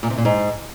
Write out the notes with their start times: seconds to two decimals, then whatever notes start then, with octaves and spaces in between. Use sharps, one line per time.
0.03 A#2
0.10 C3
0.18 A#2
0.25 G#2